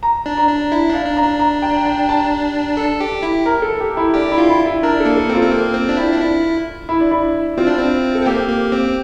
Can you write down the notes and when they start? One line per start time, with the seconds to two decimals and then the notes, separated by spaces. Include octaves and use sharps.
0.03 A#5
0.26 D4
0.37 A#5
0.49 D4
0.72 E4
0.89 D4 F5
1.05 D4
1.17 A#5
1.23 D4
1.39 A#5
1.62 G5
1.85 G5
2.09 A5
2.77 A4
3.00 G4
3.23 E4
3.46 A#4
3.62 A4
3.80 G4
3.97 E4
4.14 D4 G4
4.32 E4
4.38 F4
4.49 E4
4.66 E4
4.83 D4 A#4
5.00 A4
5.05 A#3
5.17 A4
5.29 C4
5.35 F4
5.41 C4
5.51 A#3
5.74 C4
5.89 D4
5.97 E4
6.12 D4
6.20 E4
6.89 E4
7.01 D4
7.11 E4
7.57 C4 F4
7.67 D4
7.78 C4
8.15 A4
8.26 A#3 G4
8.49 A#3
8.72 C4